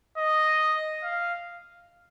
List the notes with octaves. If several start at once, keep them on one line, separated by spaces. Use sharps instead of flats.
D#5
F5